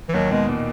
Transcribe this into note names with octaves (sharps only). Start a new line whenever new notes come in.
E3
D#2 D#3 F#3
B2 G#3
A#2